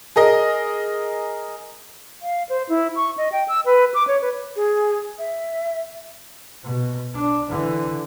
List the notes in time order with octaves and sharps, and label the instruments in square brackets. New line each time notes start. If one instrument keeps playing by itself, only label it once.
[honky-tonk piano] G#4 A#4 D#5
[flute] F5
C5
E4
C#6
D#5
G5
E6
B4
D6
C#5
B4
[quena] G#4
E5
[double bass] B2
D4
D3 E3